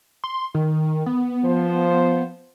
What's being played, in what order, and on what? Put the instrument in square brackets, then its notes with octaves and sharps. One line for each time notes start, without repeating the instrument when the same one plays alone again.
[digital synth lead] C6
D#3
B3
[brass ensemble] F3 C5